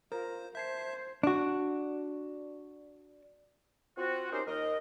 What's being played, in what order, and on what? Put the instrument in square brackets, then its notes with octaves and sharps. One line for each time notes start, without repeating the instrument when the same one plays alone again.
[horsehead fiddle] F4 [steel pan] A#4 [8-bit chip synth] C5
[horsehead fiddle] C5 [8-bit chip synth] E5 A5 [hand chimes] G6 G#6 C7
[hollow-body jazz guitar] D4 F#4
[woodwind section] C4 F4 F#4
C#4 D#4 G4 A#4 C5
D#2 A#4 D#5